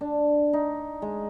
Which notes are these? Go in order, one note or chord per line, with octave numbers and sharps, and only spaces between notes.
D4
D#4
G#3